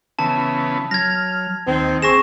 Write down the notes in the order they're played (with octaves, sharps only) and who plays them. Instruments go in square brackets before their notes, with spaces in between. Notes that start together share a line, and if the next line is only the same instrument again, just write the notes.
[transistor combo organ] C#3 E3 B3 [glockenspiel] A5
[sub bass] F#3 [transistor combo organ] F6 [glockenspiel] G#6 A#6
[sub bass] D#2 [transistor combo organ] D#3 [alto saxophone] C4
[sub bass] F#1 [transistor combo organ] C4 [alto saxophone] G#4 [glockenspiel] C#6 A#6 E7